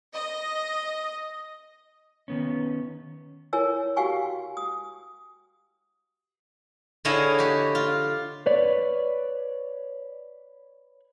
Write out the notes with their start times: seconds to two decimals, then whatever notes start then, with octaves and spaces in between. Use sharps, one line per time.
0.13 D#5
2.28 D#3 B3 C#4
3.53 E4 A#4 C#5 G#5 E6
3.96 F#4 G4 F5 G5 G#5 C#6
4.57 D#6
7.05 D3 E4 G#4 C#5 D#5 F5
7.39 F#4 G4
7.75 F4
8.46 B4 C#5 D5